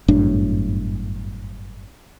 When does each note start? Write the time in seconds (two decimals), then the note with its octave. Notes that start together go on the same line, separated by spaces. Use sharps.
0.08 G1 F#2 A2 D4